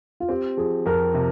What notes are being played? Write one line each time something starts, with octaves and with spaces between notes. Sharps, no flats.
F4
C4 G4
F3 G#4
F2 A#4
C3